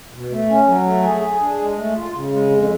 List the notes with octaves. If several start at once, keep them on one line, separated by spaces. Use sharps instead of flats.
B2
A3
C#4
F#3
A3
G#4
G#4
D4
G#3
A3
F4
C#3
G#3
F2